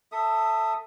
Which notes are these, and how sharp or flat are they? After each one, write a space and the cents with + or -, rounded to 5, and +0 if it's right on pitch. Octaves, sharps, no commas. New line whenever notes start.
A4 +15 E5 +0 D#6 +0